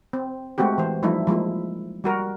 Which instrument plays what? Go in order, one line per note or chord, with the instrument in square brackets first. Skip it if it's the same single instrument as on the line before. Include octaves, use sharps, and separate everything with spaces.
[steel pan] C4
G#3 A3 C4 F#4 G4
E3 C5
F3 G3 A3 D#4 E4
F3 G#3 A#3 E4
G3 F#4 A#4